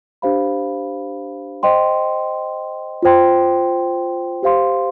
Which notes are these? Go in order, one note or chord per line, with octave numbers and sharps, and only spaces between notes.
D4 G4 C5 F5 B5
C5 D#5 G5 C6
F4 C5 G5 C6
G4 C5 F5 C6